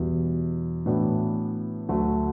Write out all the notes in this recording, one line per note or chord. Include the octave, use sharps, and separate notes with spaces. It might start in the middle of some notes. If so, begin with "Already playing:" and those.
Already playing: E2 B2 G3
A2 E3 B3 D4 F#4
D2 D3 F#3 A3